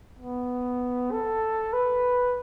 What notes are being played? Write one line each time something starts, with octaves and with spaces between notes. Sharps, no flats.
B3
A4
B4